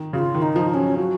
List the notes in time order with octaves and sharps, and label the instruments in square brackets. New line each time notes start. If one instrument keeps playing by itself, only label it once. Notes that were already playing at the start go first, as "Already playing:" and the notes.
Already playing: [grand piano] D#3
[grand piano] C#3 [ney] F#4
[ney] F4
[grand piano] D#3
[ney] D#4
[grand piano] F3
[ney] D#4
[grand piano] F#3 [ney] C#4
[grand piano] F#3 [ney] F#4